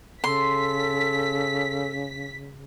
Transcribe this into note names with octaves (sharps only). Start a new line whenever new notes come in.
C#3 A4 C6 B6